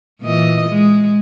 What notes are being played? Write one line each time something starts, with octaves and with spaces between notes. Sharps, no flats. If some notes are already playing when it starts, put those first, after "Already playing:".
A#2 E3 D#5
G#3